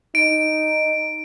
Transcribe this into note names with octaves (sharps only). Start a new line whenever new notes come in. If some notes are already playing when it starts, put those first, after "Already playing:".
D#4 D7